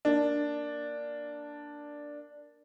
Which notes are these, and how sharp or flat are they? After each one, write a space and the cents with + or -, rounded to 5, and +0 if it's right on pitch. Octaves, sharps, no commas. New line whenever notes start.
A#3 +0 D4 +0